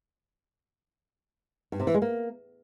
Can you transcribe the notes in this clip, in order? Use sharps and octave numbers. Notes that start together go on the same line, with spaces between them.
G2
C3
E3
G#3
A#3